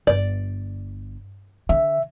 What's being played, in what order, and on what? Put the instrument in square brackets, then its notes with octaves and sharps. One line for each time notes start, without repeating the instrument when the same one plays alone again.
[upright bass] G1 [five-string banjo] D5
[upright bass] D3 [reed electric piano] E5